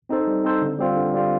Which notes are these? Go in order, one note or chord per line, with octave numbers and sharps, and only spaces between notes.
C4 D#4 A4 C5
G3
C4 D#4 A4 C5
D3
G3 C4 F4
D3
G3 C4 F4